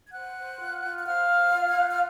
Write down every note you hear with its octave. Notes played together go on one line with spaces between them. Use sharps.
G#6
C5 F#5 F#6
C5
F4
F4
F#6
C5 F5 F6
C5
F4
G#6
F4 F#6
F6